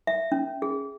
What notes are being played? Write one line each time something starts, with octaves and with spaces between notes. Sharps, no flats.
E5
C#4
G#4